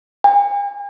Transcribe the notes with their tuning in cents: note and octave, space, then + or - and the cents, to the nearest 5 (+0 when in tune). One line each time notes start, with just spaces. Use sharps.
G#5 -45